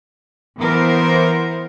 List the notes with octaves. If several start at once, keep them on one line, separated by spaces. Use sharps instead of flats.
E3 B3 A#4 C5